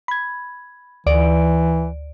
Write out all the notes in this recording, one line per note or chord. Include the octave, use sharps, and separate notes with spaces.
B5 G#6
D2 E3 D5 D7